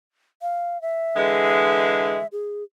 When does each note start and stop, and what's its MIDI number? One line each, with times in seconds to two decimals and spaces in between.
0.42 0.81 77
0.82 2.27 76
1.16 2.18 50
1.16 2.18 52
1.16 2.18 56
2.32 2.64 68